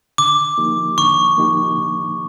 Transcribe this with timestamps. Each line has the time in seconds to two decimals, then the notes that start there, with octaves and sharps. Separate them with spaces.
0.18 D3 D6
0.58 F3 A#3 D#4 G4
0.98 D3 C#6
1.37 F3 A#3 D#4 G4
1.78 D3